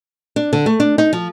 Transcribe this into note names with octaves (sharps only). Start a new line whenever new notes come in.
D4
D3
A3
D4
D#4
F3